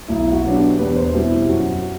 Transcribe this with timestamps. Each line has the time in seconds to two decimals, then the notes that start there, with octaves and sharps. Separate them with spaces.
0.08 B1 E4
0.32 F#4
0.44 B2 F#3 B3 D4
0.56 G4
0.79 E2 B4
0.96 C5
1.14 B2 G3 C4 E4
1.31 E4
1.49 F#2 F#4